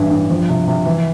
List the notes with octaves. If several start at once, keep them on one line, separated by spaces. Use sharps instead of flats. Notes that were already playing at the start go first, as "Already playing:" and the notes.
Already playing: A1 G2 E3
G2
F3
C3
C3
E3